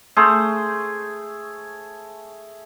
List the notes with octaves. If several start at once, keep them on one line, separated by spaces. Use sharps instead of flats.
A3 G#4 C5